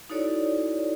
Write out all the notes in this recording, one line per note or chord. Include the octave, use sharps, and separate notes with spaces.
D#4 E4 F#4 A4 C#5 D5